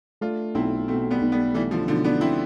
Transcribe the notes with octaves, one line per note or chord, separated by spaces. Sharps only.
A3 D4 F4
B1 C4 E4
B2 A3 C4
G3 B3
B1
G3 B3
E3 G3 A3
D3 F3
B1 D3 F3
B3 D4
B2 C4 E4